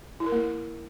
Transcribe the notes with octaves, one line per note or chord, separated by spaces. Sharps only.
E4
A#4
A#3